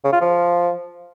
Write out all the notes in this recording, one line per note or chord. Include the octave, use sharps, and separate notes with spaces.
C#3
F4
F3